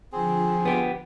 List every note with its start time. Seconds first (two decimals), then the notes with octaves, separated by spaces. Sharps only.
0.12 D3 F3 C4 G#4
0.65 B3 G4